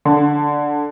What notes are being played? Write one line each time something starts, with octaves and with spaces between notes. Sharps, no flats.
D3